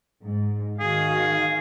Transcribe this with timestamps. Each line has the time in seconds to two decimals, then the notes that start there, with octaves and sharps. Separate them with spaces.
0.24 G#2
0.80 D#3 F#4 G#4 F5